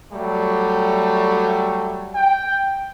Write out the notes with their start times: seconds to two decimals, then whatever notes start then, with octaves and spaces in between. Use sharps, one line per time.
0.13 F#3 G3 A3
2.14 G5